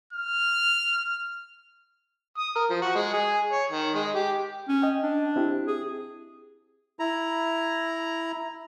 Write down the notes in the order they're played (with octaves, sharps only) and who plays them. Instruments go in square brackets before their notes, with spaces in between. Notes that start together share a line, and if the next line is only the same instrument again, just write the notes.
[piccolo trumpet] F6
[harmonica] D#6
A#4
F3
F#4
G#3
G#4
C#5
D#3
G#3
G4
[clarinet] C#4
[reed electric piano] D#5 G5
[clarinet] D4
[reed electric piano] C4 E4 G4
[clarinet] G#4
[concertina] E4 A#5